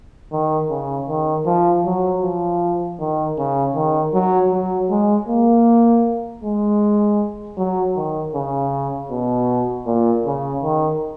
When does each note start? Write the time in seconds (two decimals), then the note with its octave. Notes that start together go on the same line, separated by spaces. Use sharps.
0.32 D#3
0.70 C#3
1.09 D#3
1.46 F3
1.85 F#3
2.22 F3
3.00 D#3
3.38 C#3
3.75 D#3
4.14 F#3
4.52 F#3
4.90 G#3
5.28 A#3
6.44 G#3
7.57 F#3
7.96 D#3
8.34 C#3
9.11 B2
9.86 A#2
10.26 C#3
10.63 D#3